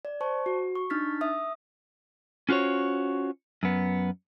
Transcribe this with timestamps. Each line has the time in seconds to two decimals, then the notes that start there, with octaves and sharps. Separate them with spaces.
0.05 D5
0.21 C5 A5 C#6
0.46 F#4
0.75 C#6
0.90 D4 D#4 F6 A6 B6
1.21 E5 D#6
2.49 C#4 F4 F#4 C5 C#5
3.63 F#2 B3